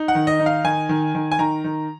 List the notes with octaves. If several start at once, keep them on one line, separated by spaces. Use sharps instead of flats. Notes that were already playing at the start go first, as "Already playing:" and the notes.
Already playing: D#4
F#5
D#3
D#5
D#4
F5
D#3 G#5
D#3
D#3
G#5
D#3 A#5
D#3